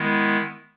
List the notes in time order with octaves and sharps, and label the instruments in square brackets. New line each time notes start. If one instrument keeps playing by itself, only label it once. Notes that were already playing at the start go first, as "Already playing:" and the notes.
Already playing: [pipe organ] D#3 G#3 B3 E4